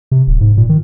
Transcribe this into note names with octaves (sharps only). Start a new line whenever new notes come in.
C3
D1
G#2
A#2
D#3